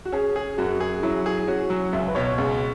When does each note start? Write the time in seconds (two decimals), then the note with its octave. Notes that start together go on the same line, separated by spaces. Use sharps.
0.05 F#4
0.12 C#4 G#4
0.36 G#4
0.58 F#2 F#4
0.80 G#4
1.03 F#3 E4
1.26 G#4
1.48 C#4 F#4
1.70 F#3
1.93 C#2 E5
2.08 B4
2.15 B2 C#5
2.37 C#2 G#4